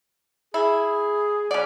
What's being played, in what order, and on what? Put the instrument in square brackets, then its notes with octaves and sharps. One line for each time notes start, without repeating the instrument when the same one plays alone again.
[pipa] E4 [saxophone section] G#4
[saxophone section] D2 G#3 F#5 [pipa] C#4 D5